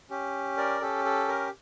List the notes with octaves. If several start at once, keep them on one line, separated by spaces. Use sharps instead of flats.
C#4 G4
A#4 D5
C#4 G4 A4
A4
A#4